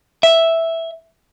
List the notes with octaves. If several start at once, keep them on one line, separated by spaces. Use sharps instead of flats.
E5